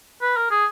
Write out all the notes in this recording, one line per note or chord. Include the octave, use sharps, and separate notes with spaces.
B4
A#4
G#4